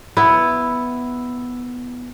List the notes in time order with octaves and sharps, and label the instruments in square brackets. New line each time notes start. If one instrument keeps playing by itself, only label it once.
[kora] B3 E4